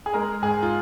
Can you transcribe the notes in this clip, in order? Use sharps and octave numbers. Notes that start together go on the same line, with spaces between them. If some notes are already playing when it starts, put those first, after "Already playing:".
G#4
G#3 A#4
G#2 G#4
F4